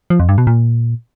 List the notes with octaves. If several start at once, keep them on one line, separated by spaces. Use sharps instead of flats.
F3
F2
G2
B2
A#2